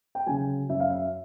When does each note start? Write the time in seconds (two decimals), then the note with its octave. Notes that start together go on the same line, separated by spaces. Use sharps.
0.15 G5
0.26 C#3 F#3 G#5
0.69 F#2 E5
0.80 F5
0.90 E5